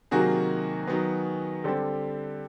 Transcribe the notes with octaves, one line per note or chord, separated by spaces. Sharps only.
C3 D#3 F#3 A#3 F#4 G#4
D#3 F#3 B3
D3 G3 C4 G4 A4